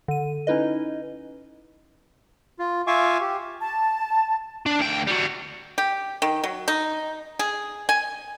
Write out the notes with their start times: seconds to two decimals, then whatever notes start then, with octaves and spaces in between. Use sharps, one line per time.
0.08 D3 D#7
0.47 C#4 D#4 E4 B4 D#5
2.59 F4
2.87 F4 E5 F5 G#5 C#6 D6
3.21 G4
3.61 A5
4.66 D4
4.80 D2 G5
5.07 G3 F#4
5.78 G4
6.22 D#3
6.44 F#3
6.68 D#4
7.39 G#4
7.89 G#5